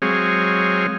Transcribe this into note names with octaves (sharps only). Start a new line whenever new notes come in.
F#3 G#3 C4 G#4 C#5 F5